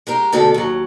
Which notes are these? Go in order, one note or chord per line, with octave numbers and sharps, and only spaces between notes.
G#3 G4 A#4
D2 B2 G#3 A4
D#2 F#3